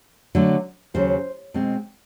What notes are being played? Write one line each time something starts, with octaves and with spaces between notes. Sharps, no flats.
D3 F#3 A3
D#2 C#3 F#3 C5
B2 G#3 C4